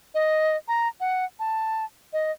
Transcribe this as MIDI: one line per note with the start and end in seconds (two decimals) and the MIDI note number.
0.15 0.57 75
0.68 0.88 82
1.00 1.25 78
1.39 1.85 81
2.13 2.32 75